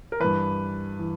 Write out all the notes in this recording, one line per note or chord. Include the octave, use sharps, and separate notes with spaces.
A#4
G2 E3 B4
E3